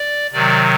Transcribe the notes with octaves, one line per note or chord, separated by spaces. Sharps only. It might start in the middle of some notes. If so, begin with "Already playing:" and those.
Already playing: D5
C3 D#3 F#3 D5